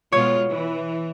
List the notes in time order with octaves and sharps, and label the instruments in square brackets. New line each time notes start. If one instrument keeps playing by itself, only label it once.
[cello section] B2 G#3 F4 [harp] C#5
[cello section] E3